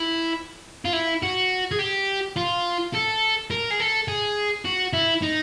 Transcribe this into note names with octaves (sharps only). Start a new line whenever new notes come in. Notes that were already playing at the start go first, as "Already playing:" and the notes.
Already playing: E4
F4
E4
F#4
G#4
G4
F4
A4
A#4
G#4
A4
G#4
F#4
E4
D#4